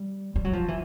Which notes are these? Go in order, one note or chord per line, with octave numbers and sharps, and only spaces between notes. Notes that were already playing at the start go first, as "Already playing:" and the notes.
Already playing: G3
G3
F#3
F3
E3